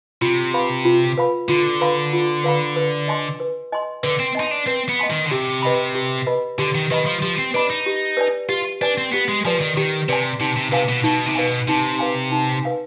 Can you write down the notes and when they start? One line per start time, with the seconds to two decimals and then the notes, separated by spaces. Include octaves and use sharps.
0.21 C3 F4
0.54 B4 F5 B5
0.85 F4
1.17 B4 F5 B5
1.49 D3 F4
1.81 B4 F5 B5
2.13 F4
2.44 B4 F5 B5
2.76 B4
3.08 D#5 G#5 C6
3.40 B4
3.72 D#5 G#5 C6
4.03 D3 B4
4.20 C4
4.35 D#4 D#5 G#5 C6
4.51 D4
4.67 C4 B4
4.89 B3
4.99 D#5 G#5 C6
5.10 D#3
5.25 D3
5.31 C3 G4
5.62 B4 D#5 B5
5.95 G4
6.27 B4 D#5 B5
6.58 D3 G4
6.75 D#3
6.91 D#3 B4 D#5 B5
7.06 F3
7.22 F3 G4
7.39 C4
7.54 D4 B4 D#5 B5
7.70 D#4
7.86 G4
8.17 B4 D5 G#5
8.49 F4 G4
8.81 D4 B4 D5 G#5
8.98 C4
9.12 B3 G4
9.28 G#3
9.45 F3 B4 D5 G#5
9.61 D#3
9.77 D#3 G4
10.08 C3 B4 D5 G#5
10.40 C3 D#4
10.56 C3
10.72 C3 B4 F5 G#5
10.89 B2
11.04 B2 D#4
11.26 C3
11.36 B2 B4 F5 G#5
11.68 C3 D#4
11.99 B4 F5 G#5
12.31 D#4
12.63 B4 F5 G#5